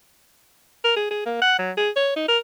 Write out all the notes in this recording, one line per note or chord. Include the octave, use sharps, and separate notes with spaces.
A#4
G#4
G#4
A#3
F#5
F#3
G#4
C#5
D#4
A#4